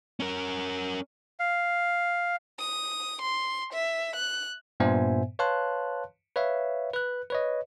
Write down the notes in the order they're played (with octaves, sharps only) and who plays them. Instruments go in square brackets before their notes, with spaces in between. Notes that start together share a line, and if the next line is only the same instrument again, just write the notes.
[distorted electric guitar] C#4 A#4
[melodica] F5
[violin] D#6
C6
E5
F#6
[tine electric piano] G2 A#2 B3 C5 E5 G#5
B4 C#5 F5 A5 C6 F#6
B4 C#5 E5 F5
B4 F#6
B4 C#5 D#5